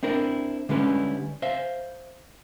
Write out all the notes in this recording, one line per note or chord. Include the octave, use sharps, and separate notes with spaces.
C4 D4 E4 A#4
D3 G3 G#3 C#4 E4 B4
C5 E5 F5